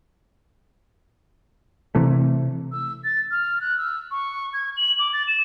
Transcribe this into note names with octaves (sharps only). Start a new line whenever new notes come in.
C3 E3 A3
E6
A6
F6
F#6
E6
C#6
G#6
F#7
D6
A6
E7